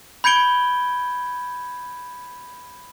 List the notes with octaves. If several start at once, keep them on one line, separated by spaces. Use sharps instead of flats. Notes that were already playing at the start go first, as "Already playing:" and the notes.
B5 G6 G#6 C#7 D7 G7